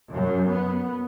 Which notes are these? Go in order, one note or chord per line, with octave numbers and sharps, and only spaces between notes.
F#2
B3